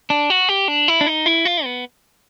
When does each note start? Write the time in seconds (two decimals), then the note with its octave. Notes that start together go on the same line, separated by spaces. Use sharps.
0.10 D4
0.30 F#4
0.49 G4
0.68 D4
0.88 E4
1.01 D4
1.07 D#4
1.26 E4
1.45 F4
1.64 B3